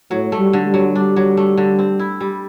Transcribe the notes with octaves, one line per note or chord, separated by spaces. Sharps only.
A2 F#3
A3
G3
D3
G3
F#3
G3 D4
F#3
A3
D3
C4
E4
G3